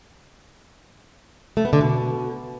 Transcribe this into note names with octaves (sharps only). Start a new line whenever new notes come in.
A3
B3
D3
B2